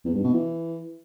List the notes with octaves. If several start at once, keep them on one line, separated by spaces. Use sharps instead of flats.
E2
G2
B2
E3